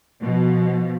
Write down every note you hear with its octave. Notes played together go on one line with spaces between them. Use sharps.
B2 F3